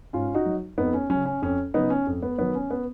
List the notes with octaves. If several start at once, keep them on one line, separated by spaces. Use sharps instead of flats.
G#2 C#4 F4
D#4 F#4
F#3
F2 B3 D#4
C#4
C#3 F#3 C#4
C#4
F2 C#4
C#3 F#3 B3 D#4
C#4
F2
B3
D#3 F#3 B3
C#4
B3